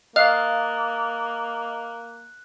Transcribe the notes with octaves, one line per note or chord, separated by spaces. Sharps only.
A#3 D#5 F5 F#6